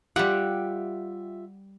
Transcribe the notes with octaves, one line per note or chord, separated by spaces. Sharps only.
G3 F4 G4 E5 F#5